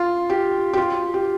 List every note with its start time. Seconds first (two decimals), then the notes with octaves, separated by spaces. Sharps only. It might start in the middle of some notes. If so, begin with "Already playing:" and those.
Already playing: F4
0.30 G4
0.73 G4
0.77 F4
1.14 G4